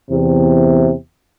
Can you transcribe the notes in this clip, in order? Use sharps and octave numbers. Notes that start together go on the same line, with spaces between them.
E2 C3